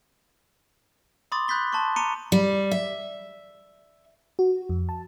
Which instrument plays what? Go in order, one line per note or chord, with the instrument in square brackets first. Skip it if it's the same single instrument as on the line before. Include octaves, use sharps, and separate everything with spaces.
[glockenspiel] B5 C6 D6 D#6 A6
B5 F#6 G6 A6 B6 G7
A5 C6 C#6
A#5 D6 C#7 D#7 G7
[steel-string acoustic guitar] G3
E5
[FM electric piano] F#4
F2
A5